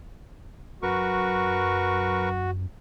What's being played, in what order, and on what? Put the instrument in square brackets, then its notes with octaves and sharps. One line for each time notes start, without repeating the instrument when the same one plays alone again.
[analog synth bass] F#2 [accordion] F#4 [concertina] A#4 B4 C#6